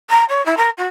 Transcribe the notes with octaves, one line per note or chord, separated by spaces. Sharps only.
A#5
C#5
E4
A#4
F#4